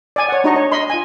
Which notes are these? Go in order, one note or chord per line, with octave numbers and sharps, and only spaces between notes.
D5 G#5
C#5 F#5
D4 D#4 F#4 D#5 A#5 C#6
C#5
D#5 B5 C6
F4 G#5